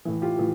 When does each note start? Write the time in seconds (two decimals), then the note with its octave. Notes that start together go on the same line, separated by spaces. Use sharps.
0.05 A2 E3
0.22 F4 G4
0.39 A2 E3